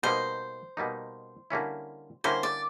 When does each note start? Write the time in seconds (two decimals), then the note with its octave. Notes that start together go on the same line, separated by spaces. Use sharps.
0.03 B2 G3 A#3 D#4 C5
0.77 B2 G3 A#3 D#4
1.50 D3 G3 A#3 C#4 E4
2.24 D3 G3 A#3 C#4 E4 C5
2.43 D5